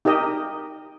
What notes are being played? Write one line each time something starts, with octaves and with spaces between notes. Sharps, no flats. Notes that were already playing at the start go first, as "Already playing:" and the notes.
D#4 G4 A#4 D#5